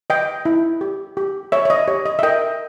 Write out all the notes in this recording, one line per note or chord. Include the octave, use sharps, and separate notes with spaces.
B4 D#5 G5
E4
G4
G4
C#5 E5
C#5
D#5
G4 C#5
D#5
E5
A#4 D#5 G5